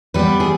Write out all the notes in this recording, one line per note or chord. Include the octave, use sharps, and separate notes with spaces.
G3 B3 B4
G#4